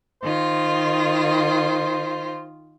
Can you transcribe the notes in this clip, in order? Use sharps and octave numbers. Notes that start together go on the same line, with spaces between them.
D#3 F4 C5